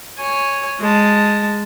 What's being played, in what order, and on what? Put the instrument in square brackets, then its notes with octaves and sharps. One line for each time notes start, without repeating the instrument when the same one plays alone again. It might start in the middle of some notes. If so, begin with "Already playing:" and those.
[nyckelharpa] C#5 G#5
G#3 A5